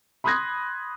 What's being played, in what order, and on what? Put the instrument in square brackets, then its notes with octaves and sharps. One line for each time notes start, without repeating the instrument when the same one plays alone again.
[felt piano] B5 C6 D#6 F#6 G#6 A#6